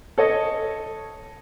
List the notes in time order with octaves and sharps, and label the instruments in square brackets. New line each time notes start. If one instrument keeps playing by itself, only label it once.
[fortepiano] A4 C#5 D#5